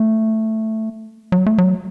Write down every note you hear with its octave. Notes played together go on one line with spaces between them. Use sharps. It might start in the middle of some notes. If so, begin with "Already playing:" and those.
Already playing: A3
F#3
A3
F#3